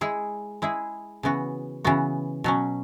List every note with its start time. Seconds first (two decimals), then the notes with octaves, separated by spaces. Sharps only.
0.01 G#3 E4 G#4
0.62 G#3 E4 G#4
1.23 C#3 E3 B3 F#4
1.85 C#3 E3 B3 F#4
2.44 B2 F#3 C#4